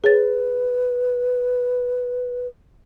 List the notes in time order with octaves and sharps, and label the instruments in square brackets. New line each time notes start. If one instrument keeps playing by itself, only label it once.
[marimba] G#4 C#5 A6 [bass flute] B4